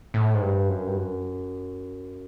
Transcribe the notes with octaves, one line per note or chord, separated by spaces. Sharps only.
A2
G#2
G2
F#2
G2
F#2